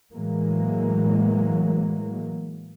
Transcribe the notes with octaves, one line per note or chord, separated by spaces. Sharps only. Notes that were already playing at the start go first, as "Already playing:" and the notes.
A2 E3 F#3 G#3 A#3